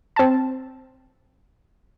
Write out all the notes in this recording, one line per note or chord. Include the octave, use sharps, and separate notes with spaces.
C4 A5